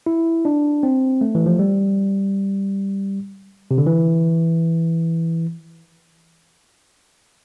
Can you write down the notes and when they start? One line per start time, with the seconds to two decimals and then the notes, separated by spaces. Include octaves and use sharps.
0.06 E4
0.45 D4
0.83 C4
1.21 A3
1.35 E3
1.46 F3
1.59 G3
3.71 C3
3.78 D3
3.86 E3